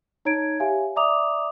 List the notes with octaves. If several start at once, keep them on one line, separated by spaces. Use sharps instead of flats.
D#4 C#5 A#5 G#6 D7
G4 C#5 E5 F5 G#5
D5 E5 A#5 D6 D#6 F7